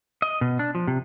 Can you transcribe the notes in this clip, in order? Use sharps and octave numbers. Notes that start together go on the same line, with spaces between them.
D#5
B2
D4
F3
C3